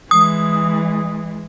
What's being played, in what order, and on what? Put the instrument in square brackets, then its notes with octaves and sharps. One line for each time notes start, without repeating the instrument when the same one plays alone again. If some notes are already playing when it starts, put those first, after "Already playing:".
[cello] E3 G#3 [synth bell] D#6